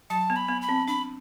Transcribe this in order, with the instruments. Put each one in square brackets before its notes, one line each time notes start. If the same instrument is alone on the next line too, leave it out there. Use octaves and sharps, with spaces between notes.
[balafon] F#3 [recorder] A5
[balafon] B3
[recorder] B5
[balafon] B3
[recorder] B5
[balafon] C4
[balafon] D4 [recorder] B5